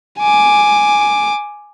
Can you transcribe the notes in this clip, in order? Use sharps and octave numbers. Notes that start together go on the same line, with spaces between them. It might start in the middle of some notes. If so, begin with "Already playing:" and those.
G#5 D6